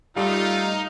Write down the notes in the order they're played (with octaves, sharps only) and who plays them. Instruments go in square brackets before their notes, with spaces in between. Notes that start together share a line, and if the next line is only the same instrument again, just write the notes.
[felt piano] G3 [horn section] A3 F4 [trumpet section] D#4 [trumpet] F5